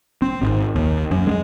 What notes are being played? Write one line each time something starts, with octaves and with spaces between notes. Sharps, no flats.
C4
G#1
D#2
F#2
G#3